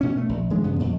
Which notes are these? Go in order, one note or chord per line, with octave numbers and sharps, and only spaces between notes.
B2 C#4
A3
A#1
E3 G#3 D4
G2 C#3 B3
F2 A#2 D3